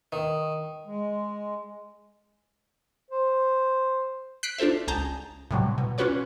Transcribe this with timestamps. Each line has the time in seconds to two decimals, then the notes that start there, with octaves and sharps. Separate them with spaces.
0.12 D#3
0.87 G#3
3.10 C5
4.43 F#6 B6 C7 D7
4.58 D4 F4 A4 C5 E5
4.88 C#2 G#4 A5 A#5 G6
5.51 A2 C3 F#3 G3
5.78 B2
5.98 C#4 F4 F#4 B4 C#5 D5